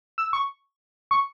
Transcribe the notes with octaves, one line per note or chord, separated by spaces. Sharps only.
E6
C#6
C#6